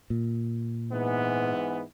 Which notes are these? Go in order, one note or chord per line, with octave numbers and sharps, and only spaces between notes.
A#2
G#2 E3 B3